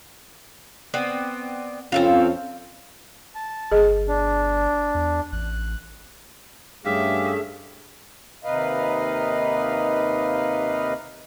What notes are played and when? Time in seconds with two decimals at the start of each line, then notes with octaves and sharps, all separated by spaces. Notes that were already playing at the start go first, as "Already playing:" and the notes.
0.94 B3 C4 D5
1.92 F2 C4 C#4 F4 A4 F5
3.35 A5
3.71 G1 G#4 D#5
4.08 D4
4.95 E2
5.32 A1 F#6
6.85 G2 A3 C#4 G4 G#4 E5 F5
8.44 D#2 C3 D#4 B4 D#5 F5